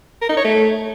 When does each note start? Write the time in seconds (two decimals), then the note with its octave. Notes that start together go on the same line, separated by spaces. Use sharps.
0.22 A#4
0.29 D#4
0.37 C#5
0.45 A3